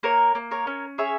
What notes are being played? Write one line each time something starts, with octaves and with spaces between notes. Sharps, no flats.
A#3 A#4 C#5
A#3
A#4 C#5
C#4
G#4 C#5 E5